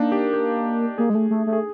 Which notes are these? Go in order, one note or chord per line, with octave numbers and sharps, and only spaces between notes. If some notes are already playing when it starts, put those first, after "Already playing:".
Already playing: A#3 D4 D#4
G4
G4
A#3 G#4
G#3
A3
A3
A3
G#4